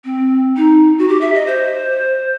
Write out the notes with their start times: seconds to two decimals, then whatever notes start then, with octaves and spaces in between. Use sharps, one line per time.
0.05 C4
0.57 D#4
0.98 F#4
1.08 G4
1.21 E5
1.34 D#5
1.47 C5